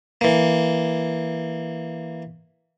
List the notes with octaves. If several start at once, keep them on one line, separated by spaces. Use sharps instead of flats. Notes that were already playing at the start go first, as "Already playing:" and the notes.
E3 A#3